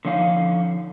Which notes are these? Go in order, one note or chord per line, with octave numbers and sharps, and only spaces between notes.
D3 F3 C#4 D#4 F5